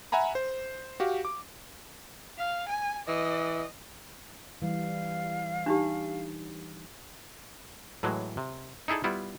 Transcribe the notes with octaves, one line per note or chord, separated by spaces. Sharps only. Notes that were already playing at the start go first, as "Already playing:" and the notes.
E5 F#5 G#5 A#5 B5
C5
F#4 G4 F5
D6
F5
G#5
E3 D#5
E3 G3 F5
D4 D#4 G4
A2 E3 F#3 G#3
C3
D#4 E4 G#4 A4 D5
G3 B3 E4 F4